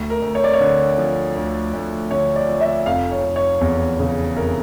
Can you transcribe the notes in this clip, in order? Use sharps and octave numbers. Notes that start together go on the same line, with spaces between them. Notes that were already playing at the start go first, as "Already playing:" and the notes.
Already playing: D2
A#4
D2
C#5
D5
C#5
D3
F3
D2
D2
D3 C#5
D5
F3
E5
F1 F5
C#5
F1
C#5
E2
C#3
F1 A#4